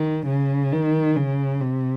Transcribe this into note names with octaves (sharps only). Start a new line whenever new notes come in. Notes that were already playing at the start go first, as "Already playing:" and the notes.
Already playing: D#3
C#3
D#3
C#3
C3